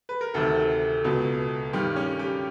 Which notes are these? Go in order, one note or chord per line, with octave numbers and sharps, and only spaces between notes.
B4
A#4
D2 C3 D#3 A4
C#2 B2
G2 D#3 G4
C#4
G4